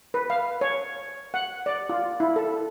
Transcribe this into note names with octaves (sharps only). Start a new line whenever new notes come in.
B4
F5
C#5
F#5
D5
F4
E4
A4